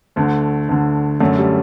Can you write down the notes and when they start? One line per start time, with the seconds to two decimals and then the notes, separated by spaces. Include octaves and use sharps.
0.16 D2 D3 A3
0.69 D2 D3
1.20 F#2 D3 A3
1.38 G3